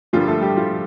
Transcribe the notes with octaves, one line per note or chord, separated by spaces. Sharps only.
G2 D3 F3 G3 A#3 F4
A3 A4
G3 G4
F3 F4